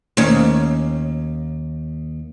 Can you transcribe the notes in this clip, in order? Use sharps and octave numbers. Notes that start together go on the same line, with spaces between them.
D#2 C#4